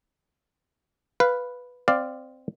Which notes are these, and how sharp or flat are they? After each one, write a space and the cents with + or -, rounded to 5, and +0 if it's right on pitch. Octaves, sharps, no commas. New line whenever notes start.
B4 +0 F5 +0
C4 -10 D5 +10 F5 +0